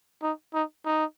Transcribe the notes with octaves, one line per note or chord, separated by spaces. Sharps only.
D#4
D#4
D#4